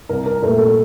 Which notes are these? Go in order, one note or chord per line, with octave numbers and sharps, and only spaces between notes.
C2 A#4
A#4
A#2 A3 A#4
A4